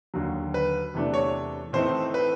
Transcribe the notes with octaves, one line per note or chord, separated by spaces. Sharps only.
D#2 D3 F#3
B4
E2 C3 E3 A3 D4
C#5
A2 E3 A3 C4 D#4 C5
B4